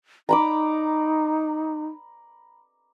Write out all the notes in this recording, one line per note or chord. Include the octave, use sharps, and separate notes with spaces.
D#4 A#5 B5 D6